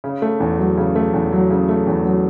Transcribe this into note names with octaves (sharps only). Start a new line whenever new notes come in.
C#3
A3
E2
F#3
C#3
A3
E2
F#3
C#3
A3
E2
F#3